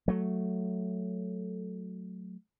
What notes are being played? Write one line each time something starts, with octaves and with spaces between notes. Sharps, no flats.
F#3 A3